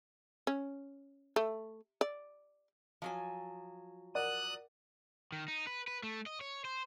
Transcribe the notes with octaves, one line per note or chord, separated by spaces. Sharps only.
C#4
A3
D5
F3 F#3 G#5
A#4 D5 F#5 D#6 F#6
D#3
D#4
B4
B4
A3
D#5
C#5
C5